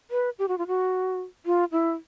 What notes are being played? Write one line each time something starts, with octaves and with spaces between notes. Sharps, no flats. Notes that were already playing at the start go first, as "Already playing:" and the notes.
B4
G4
F#4
F4
F#4
F4
E4